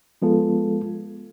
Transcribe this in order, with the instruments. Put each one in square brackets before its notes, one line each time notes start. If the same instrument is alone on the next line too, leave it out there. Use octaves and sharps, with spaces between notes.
[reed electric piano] F3 G#3 B3 F4 A4